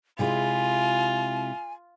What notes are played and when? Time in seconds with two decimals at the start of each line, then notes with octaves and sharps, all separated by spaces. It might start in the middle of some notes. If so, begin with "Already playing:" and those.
0.19 C3 G#3 E4 F4 G#5